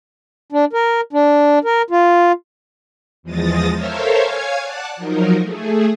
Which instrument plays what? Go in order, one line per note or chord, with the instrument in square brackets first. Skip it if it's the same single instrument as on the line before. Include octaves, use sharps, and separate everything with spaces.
[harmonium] D4
A#4
D4
A#4
F4
[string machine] E2 F3 G#3 D#6 A6 A#6
A4 A#4 C5 C#5 E5 F5
C#5 F5 G#5 G#6
D5 F#5 A5 F#6
F3 F#3 D#4 A#4
A3 G#4